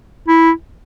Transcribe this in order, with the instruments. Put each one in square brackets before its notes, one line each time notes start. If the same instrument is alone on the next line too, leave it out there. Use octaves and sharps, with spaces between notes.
[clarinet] E4